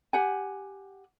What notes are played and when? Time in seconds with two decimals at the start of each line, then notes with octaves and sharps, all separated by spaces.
0.13 G4 F#5 G#5